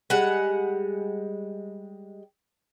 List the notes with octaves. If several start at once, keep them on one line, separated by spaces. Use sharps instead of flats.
G3 G#3 F#5